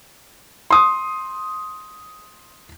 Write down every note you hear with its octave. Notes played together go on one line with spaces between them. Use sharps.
C6 D#6